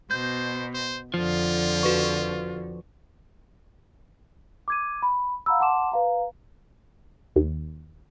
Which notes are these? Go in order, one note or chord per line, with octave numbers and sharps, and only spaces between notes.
B2 C5 G6
C5
F2 D3 F3 F4
F#4 B4 C#6
D6 G#6 D#7
B5
F5 F#5 A#5 B5 E6
F#5 A5 C6 D6 E7
B4 F5 A#5
D#2